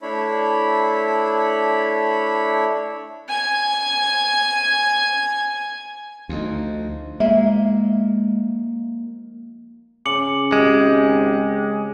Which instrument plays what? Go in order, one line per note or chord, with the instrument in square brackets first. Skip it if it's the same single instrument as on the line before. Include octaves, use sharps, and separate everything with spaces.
[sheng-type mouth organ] A3 D4 E4 C#5 B5
[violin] G#5 G#6
[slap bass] D2 [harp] F3 D#4
[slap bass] G#3 [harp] A#3 [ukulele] E5
[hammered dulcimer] C#3 [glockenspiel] D6 C#7 F#7
[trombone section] G#1 G4 [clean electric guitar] G#3